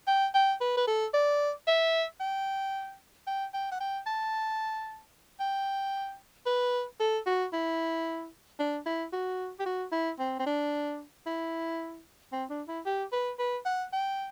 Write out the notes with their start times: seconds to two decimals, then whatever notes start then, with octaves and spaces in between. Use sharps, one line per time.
0.07 G5
0.34 G5
0.61 B4
0.77 B4
0.87 A4
1.14 D5
1.67 E5
2.20 G5
3.27 G5
3.54 G5
3.72 F#5
3.80 G5
4.06 A5
5.40 G5
6.46 B4
7.00 A4
7.26 F#4
7.53 E4
8.59 D4
8.86 E4
9.12 F#4
9.59 G4
9.66 F#4
9.92 E4
10.19 C4
10.39 C4
10.46 D4
11.26 E4
12.32 C4
12.50 D4
12.68 E4
12.85 G4
13.12 B4
13.39 B4
13.65 F#5
13.93 G5